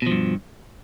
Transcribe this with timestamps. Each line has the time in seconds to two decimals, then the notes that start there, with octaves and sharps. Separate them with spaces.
0.02 B2
0.07 F3
0.11 G2